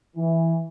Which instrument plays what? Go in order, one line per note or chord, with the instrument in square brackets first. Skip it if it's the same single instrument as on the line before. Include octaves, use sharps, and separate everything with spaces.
[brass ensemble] E3